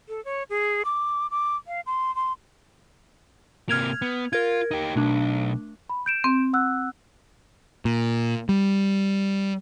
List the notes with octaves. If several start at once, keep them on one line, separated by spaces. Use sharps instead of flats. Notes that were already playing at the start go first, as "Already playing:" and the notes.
A4
C#5
G#4
D6
D6
F5
C6
C6
C3 A#3 F6 G#6 F7
B3
F4 A#4 G#6
D#4 G4
B1 A3 D4
B5
G6 D7 E7
C4
F#5 E6 F#6
A#2
G3